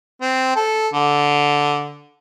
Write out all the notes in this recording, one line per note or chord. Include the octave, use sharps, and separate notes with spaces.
C4
A4
D3